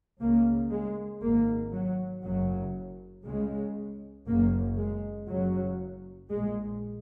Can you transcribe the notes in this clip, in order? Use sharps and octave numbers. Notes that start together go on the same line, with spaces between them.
C#2 C#3 A#3
G#3
G#1 G#2 A#3
F#3
F#1 F#2 C#3 F#3
C#2 C#3 G#3
F#1 F#2 C#3 A#3
G#3
F#1 F#2 C#3 F#3
A#1 A#2 G#3